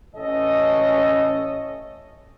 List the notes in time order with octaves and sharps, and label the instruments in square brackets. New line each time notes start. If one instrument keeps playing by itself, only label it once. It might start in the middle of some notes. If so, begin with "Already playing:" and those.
[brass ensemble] A1 C#4 A4 D#5